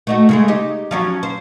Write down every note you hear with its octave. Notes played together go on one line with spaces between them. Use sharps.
A3 D#4 F#4
C#3 G#3 A3
D#4 G4
F3 F#3 C#4
C5